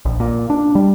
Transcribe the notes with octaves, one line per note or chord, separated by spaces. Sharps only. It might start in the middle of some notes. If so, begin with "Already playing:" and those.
A#1
A#2
D4
G3